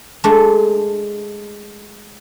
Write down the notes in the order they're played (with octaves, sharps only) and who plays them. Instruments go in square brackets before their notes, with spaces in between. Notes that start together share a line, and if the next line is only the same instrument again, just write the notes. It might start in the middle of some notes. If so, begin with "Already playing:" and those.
[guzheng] G#3 A3 D4